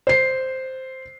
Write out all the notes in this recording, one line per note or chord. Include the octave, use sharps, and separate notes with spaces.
C5 C7